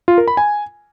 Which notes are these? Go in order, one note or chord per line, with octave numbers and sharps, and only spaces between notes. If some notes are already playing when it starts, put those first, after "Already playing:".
F4
A#4
B5
G#5